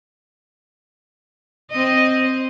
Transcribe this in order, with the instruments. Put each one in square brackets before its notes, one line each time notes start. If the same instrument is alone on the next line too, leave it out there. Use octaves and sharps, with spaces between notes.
[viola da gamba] C4 D#5